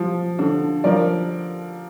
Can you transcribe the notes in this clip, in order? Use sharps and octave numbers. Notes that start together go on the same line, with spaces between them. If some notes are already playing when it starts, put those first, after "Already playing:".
Already playing: F3
D3
F3 A#4 D5